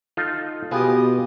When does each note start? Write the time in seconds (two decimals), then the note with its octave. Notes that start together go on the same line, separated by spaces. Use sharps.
0.17 D#4 F4 A4
0.71 B2 B3 F4 G4 G#4 D#5 G#5